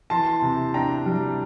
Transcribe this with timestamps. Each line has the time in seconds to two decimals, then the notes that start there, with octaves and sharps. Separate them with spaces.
0.10 E3 A5 C6
0.42 C3
0.74 D4 G5 A#5
1.06 G3